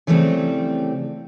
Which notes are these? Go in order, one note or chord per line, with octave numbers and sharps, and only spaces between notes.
C#3 E3 F3 G3 A3 C4